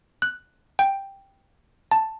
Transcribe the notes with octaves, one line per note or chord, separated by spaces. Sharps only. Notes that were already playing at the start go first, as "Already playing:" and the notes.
F#6
G5
A5